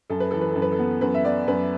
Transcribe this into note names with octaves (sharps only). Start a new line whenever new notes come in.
F#2 A4
B4
E3 A4
B4
F#2 A4
B4
A4
B3
F#2 B4
E5
B3 D5
F#2 B4